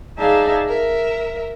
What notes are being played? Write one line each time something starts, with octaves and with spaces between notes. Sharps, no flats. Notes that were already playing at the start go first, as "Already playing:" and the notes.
D#4 G#4 D5 E5 F5 A5
A#4 E5